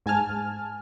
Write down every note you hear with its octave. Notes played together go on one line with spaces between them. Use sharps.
G#2 G#5 A5 F6